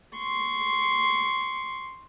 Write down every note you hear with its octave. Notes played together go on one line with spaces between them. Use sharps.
C6 C#6